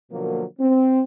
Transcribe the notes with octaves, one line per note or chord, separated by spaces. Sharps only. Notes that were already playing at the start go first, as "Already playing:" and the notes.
B2 D3 F3 F#3 A#3
C4